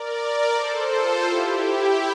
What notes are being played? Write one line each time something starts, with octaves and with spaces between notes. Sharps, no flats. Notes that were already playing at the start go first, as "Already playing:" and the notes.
Already playing: A#4 D5
A4 C5
F4 A4
E4 G4
E4